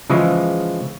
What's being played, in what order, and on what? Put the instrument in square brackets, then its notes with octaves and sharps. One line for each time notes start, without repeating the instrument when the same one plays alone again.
[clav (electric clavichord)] C#3 E3 F3 G#3